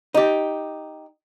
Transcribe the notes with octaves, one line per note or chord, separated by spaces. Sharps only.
D#4 G4